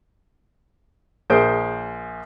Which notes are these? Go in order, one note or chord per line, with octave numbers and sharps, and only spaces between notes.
A#1 G#4 A#4 C5 G6 D7